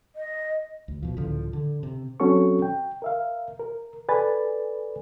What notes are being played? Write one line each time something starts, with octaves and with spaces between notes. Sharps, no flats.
D#5
D2
B2 F3
C#2 A2 D3 F3
D3
C3
F#3 C4 C#4 F#4 A4 C#6
G5
A#4 E5 F5
A#4
A4 B4 D5 G#5 B5 A6